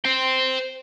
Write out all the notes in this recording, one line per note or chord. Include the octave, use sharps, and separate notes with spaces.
C5 G5